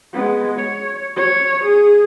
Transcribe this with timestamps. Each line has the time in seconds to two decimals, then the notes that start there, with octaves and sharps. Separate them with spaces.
0.13 G#3 B3
0.59 C#5
1.17 C#5
1.64 G#4